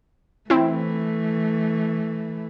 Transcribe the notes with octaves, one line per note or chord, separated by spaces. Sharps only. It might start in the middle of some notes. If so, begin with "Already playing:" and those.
E3 A3 C4 E4